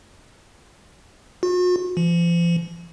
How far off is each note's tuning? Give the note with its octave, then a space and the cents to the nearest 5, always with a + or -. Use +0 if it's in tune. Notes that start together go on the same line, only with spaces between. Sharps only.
F#4 -45
F3 -40